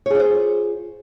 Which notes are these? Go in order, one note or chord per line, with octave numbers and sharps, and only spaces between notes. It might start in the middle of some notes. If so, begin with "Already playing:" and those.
F4 G#4 C5 C#5